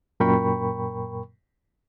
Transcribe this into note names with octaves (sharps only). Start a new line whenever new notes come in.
F#2 A#2 A#4 G5 B5 C#6